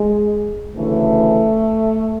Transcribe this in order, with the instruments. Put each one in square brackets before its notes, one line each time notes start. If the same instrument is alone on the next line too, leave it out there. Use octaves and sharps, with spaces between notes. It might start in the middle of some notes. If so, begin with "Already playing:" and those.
Already playing: [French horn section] G#3
D2 C#3 E3 A3